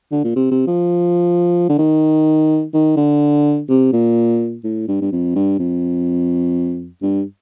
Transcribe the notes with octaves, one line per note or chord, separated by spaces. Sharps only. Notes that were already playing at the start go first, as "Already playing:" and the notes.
D3
A#2
C3
C3
F3
D3
D#3
D#3
D3
C3
A#2
A2
G2
G2
F2
G2
F2
G2